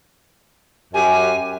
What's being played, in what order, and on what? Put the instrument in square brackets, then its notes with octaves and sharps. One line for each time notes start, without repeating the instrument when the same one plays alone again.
[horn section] F#2 G4 [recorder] G#5